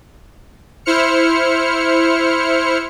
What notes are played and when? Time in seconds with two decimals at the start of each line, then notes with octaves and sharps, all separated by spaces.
0.85 E4 C5 F6 C#7